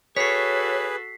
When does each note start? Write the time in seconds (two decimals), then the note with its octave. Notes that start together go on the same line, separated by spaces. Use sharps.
0.17 F#4 G#4 A4 B4 C#5 B6 C7